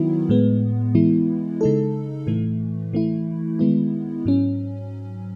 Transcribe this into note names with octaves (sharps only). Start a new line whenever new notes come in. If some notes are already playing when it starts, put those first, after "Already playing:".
Already playing: D#3 F#3 B3 E4
A2 G#3 B3
E3 G#3 B3 E4
C#3 G#3 D#4 A4
A2 E3 A3
E3 A3 E4
D#3 G#3 B3 E4
G#2 F#3 C#4